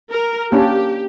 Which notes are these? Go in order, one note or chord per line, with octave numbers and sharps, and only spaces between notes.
A#4
A#3 C#4 D4 G4